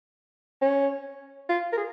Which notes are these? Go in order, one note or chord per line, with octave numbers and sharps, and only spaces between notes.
C#4
F4
A#4
G#4